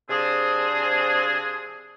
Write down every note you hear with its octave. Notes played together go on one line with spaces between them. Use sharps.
C3 F3 C4 D4 G#4